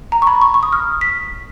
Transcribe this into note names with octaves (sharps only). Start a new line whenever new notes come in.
A#5
C#6
B5
C#6
C#6
D#6
F6
B6